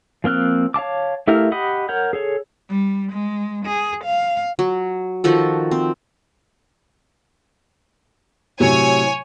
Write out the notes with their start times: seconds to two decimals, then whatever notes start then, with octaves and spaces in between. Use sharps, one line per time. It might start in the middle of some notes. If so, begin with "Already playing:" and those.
0.24 F3 A#3 C4 F6 F#6
0.74 C#5 F5 A5 D6
1.28 A3 E4 G4 A#4 F5
1.52 G4 D#5 F#5 B5 D#6
1.89 A#4 C#5 F#5 G6
2.13 G#4 A4 C#5
2.70 G3
3.12 G#3
3.66 G#4
4.05 F5
4.59 F#3
5.24 D#3 F3 F#4 A4
5.71 C4
8.60 A2 C3 F#3 C#5 G#5